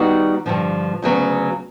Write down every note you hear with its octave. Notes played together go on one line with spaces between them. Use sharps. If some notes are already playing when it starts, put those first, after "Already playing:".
Already playing: D#3 G3 B3 D#4 F#4
G2 D3 F3
D2 C#3 F#3 B3